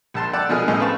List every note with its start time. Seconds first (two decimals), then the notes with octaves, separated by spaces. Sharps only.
0.14 A#1 A#2 A5 C6
0.33 D5 F#5 G5 A5 D6 E6
0.49 B2 F3 G#3 A#3 G#4 F6
0.68 A#1 A2 C#4 G#4 D#5
0.80 C4 B4 F5 A5 C#6